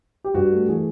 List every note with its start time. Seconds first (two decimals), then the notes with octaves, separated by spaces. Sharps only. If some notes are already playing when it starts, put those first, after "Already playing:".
0.24 G4
0.34 G2 F#4
0.52 A3
0.68 E3 G#4